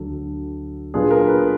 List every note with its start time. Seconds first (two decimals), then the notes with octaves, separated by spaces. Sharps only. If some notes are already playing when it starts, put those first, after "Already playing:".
Already playing: D2 D3 F#3 A4
0.94 A#2 F#3 B3 D4 F4 G#4
1.11 A#4
1.27 B4